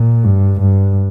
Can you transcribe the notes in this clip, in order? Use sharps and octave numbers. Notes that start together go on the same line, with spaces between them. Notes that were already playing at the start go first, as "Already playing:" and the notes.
Already playing: A#2
G2
G2